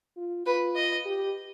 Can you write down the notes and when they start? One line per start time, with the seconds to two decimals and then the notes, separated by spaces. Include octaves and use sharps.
0.17 F4
0.46 F4 B4
0.76 D#5
1.06 G4